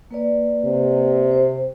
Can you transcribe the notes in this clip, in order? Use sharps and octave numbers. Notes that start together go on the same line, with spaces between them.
A#3 B4 D5
C3
C5